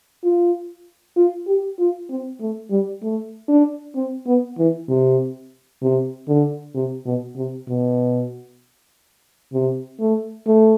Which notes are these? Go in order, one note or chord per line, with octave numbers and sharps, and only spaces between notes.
F4
F4
G4
F4
C4
A3
G3
A3
D4
C4
B3
E3
C3
C3
D3
C3
B2
C3
B2
C3
A3
A3